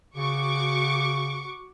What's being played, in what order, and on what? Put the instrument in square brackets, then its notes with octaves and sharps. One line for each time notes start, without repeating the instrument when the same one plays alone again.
[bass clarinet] C#3 [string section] F#4 C#6 D6